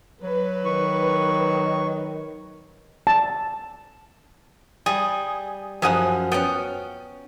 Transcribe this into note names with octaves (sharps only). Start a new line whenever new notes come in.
F#3 B4
D#3 C#6
A5
G3 G#4
F#2 F3 C#4 G#4 F#5
B3 C#4 F#5 G5